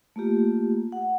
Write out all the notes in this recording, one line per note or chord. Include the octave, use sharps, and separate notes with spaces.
A3 A#3 F4 G4
F#5